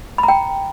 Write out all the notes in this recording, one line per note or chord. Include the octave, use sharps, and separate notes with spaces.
B5
A#5
G5